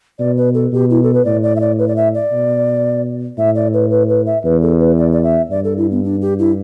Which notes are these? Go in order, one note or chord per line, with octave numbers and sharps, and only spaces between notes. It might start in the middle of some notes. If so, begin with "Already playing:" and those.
B2 D5
B4
A4
B2 G4
E4
A4
B4
A2 D5
D5
E5
D5
B4
D5
E5
D5
B2
A2 E5
D5
B4
B4
B4
E5
E2 B4
A4
B4
D5
D5
E5
G2 D5
A4
E4
B3
D4
G4
E4